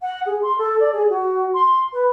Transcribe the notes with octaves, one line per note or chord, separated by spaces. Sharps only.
F#5
G#4
C6
A4
D5
G#4
F#4
C6
B4